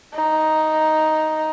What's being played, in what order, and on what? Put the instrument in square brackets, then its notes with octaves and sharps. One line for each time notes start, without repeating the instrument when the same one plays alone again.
[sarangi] D#4